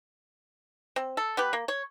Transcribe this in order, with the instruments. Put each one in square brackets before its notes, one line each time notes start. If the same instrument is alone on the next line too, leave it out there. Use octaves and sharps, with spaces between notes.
[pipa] C4
A4
B3 G4 B4
A#3
C#5